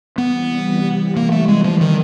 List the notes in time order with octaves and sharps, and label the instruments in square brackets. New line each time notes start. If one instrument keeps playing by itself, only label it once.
[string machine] C3 E3 G3 [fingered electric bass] B3
[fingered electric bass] A#3
A3
G#3
F3
D#3